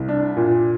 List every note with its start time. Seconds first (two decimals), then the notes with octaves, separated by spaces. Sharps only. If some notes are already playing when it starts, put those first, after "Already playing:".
Already playing: C2
0.09 D4
0.36 A#2